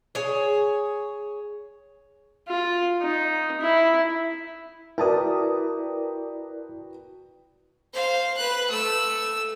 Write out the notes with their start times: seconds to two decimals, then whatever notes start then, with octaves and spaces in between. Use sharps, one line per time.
0.15 G#4 C#5
2.48 F4
3.02 D#4
3.61 E4
4.98 E4 F#4 A#4 B4 D5 G5 A5 D#6
7.94 C5 F5
8.37 B4 F#6
8.70 A3 E6